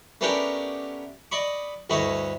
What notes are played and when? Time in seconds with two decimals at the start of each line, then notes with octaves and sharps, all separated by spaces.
0.21 A3 B3 C#4 D4 G4 A#4
1.32 D5 D#5 B5 C#6
1.90 D2 G2 A3 E4 C#5 D#5